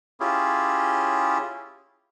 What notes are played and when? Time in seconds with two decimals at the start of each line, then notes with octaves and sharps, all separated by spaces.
0.20 C#4 E4 F4 G4 G#4